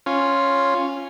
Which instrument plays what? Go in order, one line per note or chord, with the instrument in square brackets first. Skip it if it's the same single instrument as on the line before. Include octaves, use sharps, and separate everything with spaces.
[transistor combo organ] C#4 F4